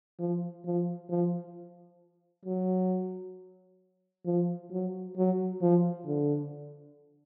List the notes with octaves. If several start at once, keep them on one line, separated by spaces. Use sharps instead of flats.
F3
F3
F3
F#3
F3
F#3
F#3
F3
D3